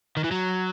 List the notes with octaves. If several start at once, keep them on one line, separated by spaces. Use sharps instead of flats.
D#3
E3
F#3